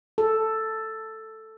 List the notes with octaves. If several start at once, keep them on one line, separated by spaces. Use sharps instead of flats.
A4